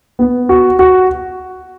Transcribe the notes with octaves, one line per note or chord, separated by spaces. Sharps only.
B3
F#4
F#4